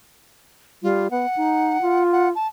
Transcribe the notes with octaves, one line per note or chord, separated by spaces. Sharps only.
G3 F4
B3 F#5
D#4
F4
F#5
A5